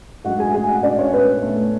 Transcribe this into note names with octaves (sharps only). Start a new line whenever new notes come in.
G#2 F#3 A3 D4 F#4 F#5
G#4 G#5
G#4 G#5
F#4 F#5
D4 D5
C#4 C#5
B3 B4
B3 B4
A3 A4